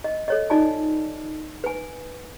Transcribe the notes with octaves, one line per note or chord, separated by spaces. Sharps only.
D#5
A4 C#5 D#5
D#4 F4 D5 D#5 G#5 A5
B4 G#5